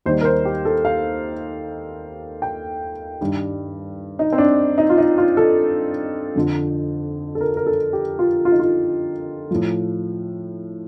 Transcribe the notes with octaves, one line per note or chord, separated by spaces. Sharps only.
D#2 D#3 G3 C5
A#4
C5
G4
A4
F5
G5
G2 D#3 G3
D#4
C4
D4
D#4
F4
D#4
F4
A4
F2 D3 F3
A4
A#4
A#4
A4
G4
F4
F4
D#4
F4
A2 F3